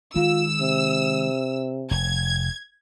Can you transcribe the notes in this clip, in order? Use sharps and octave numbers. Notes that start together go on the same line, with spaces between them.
D#3 G#3 F4 E6
C3
F1 G#6